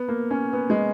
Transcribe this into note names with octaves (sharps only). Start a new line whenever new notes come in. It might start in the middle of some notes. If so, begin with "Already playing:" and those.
Already playing: B3
A#3
C#4
B3
G#3